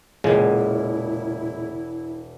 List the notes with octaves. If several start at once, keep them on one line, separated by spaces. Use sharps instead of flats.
E1 A#2 C#3 G#3 E4